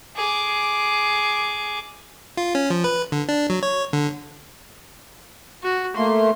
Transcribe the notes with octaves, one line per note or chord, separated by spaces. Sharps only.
G#4 D6
F4
C#4
F3
B4
D3
D4
F#3
C#5
D3
F#4
A3 A#3 C6